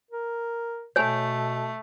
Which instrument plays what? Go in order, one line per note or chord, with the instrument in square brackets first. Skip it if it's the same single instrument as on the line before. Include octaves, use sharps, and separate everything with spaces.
[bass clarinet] A#4
[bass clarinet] B2 [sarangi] A3 [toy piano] C#5 G#5